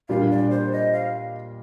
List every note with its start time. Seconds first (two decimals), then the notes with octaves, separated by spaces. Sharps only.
0.09 A#2 G3 D4 F5
0.30 D5
0.50 C5
0.72 D#5
0.93 F5